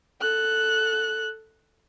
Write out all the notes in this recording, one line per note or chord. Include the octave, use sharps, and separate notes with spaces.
A4 F#6